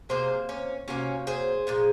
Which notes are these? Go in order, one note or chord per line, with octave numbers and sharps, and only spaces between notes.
C3 F#3 A#3 G#4 C5
C#4
C3 F#3 A#3 C#4
G#4 C5
A#2 F3 G#3